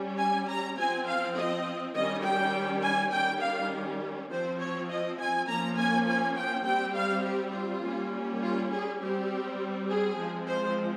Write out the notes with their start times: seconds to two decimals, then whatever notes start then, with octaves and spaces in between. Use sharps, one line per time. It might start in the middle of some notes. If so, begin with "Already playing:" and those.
Already playing: G3 C#4
0.18 G#5
0.48 A#5
0.77 F3 C4 G#5
1.06 F5
1.36 D#5
1.95 D#3 G3 C#4 D#5
2.24 G5
2.82 G#5
3.12 D#3 G3 C#4 G5
3.42 F5
4.30 F3 C4 C5
4.59 C#5
4.89 D#5
5.19 G#5
5.47 F3 A#3 C#4 A#5
5.77 G#5
6.06 G#5
6.36 G5
6.65 G3 C4 G5
6.95 F5
7.24 G4
7.54 F4
7.82 G3 A#3 C#4
8.41 F4
8.70 G#4
9.00 G3 C4 G4
9.88 G#4
10.18 F3 G#3 C4
10.47 C5